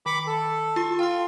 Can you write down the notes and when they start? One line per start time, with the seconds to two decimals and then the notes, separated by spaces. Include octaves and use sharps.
0.06 D#3 B5 D6 C#7
0.27 A4
0.76 F4 C6
0.99 F4 G5 C6